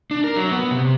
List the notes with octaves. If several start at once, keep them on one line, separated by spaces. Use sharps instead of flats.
D4
A#4
F#3
B3
C3